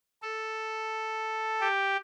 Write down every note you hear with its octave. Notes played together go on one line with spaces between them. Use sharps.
A4
G4